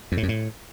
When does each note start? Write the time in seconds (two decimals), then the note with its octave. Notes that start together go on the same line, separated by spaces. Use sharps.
0.12 F2
0.17 A2
0.23 F#2
0.29 A2